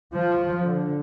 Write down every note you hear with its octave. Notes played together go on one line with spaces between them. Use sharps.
F3
D3